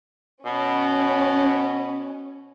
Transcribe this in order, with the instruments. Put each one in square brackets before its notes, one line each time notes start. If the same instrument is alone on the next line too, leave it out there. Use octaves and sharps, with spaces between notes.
[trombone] B2 [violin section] C#4